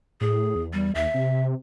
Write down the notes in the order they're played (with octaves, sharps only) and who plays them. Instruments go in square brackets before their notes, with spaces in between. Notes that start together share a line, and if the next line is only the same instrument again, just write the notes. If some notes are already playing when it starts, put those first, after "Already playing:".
[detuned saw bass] A2 [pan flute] G#4
[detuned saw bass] E2
[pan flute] G3
[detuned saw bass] D#2 [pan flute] E5
[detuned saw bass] C3